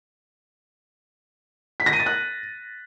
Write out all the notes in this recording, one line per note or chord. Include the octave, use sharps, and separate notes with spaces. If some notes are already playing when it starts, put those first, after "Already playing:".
B6
A#6
D#7
A6
F#6